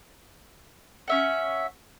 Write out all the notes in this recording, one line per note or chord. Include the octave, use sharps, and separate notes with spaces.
C#4 E5 F#5